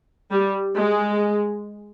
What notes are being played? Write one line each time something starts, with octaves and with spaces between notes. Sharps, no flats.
G3
G#3